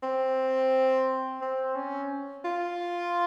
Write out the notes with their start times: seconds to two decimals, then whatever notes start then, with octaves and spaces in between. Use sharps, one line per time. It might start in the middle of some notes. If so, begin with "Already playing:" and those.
0.03 C4
1.41 C4
1.76 C#4
2.45 F4